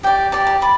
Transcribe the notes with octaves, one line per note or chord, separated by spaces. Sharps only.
G4 D5 G5
G4 D5 A5
A5
D5 B5